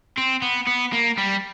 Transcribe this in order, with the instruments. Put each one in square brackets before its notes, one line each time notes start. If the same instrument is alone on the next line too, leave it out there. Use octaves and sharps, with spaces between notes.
[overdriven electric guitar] C4
B3
B3
A#3
G3